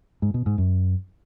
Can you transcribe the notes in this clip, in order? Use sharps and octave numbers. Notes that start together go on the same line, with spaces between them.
G#2
B2
G#2
F#2